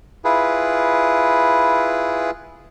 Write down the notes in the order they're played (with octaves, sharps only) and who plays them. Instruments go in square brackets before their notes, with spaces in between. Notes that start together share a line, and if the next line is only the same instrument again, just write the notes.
[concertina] E4 F4 G#4 B4